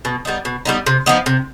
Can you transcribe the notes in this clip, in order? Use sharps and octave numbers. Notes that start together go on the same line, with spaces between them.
B2
G3 B3 D#4
B2
G3 B3 D#4
C3
F3 B3 D#4
C3